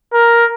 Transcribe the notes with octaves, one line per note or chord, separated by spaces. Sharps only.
A#4